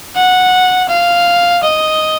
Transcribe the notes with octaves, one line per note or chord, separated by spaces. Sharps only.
F#5
F5
D#5